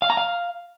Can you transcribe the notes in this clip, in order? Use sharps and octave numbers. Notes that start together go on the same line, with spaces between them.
F5
A#5
F5